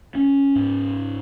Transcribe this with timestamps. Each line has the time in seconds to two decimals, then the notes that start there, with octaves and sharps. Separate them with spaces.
0.15 C#4
0.55 G#2